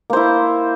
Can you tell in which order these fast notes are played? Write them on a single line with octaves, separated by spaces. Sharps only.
A#3 C5 E4